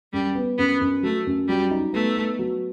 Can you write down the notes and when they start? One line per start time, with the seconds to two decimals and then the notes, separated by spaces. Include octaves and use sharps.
0.13 F#2 G3
0.35 B3
0.58 F#2 B3
0.81 F#2
1.03 F#3 A3
1.26 F#2
1.48 F#3 G3
1.71 D#4
1.93 A3 B3
2.16 B3
2.39 F#3